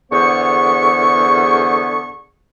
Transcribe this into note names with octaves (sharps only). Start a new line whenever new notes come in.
E2 D3 B3 G#4 C5 C#6